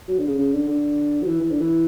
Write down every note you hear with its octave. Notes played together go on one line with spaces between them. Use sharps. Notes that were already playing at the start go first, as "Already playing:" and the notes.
F#3
D3
C#3
C#3
D3
D3
F#3
E3
E3
D3
E3